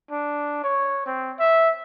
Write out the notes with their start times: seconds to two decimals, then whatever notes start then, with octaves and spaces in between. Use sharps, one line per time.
0.11 D4
0.64 C#5
1.06 C4
1.39 E5